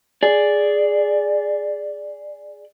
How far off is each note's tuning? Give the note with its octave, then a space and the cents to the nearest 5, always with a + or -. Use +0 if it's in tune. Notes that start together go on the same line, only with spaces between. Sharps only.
G#4 +0 D5 +0